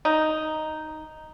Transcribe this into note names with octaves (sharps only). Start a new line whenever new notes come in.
D#4